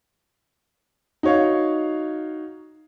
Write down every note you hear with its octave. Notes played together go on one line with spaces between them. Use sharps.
D#4 F#4 C#5 F5